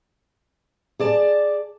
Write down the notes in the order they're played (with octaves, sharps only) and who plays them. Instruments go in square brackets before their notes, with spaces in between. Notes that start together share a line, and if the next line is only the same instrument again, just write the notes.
[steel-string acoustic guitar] G#4 D5 A5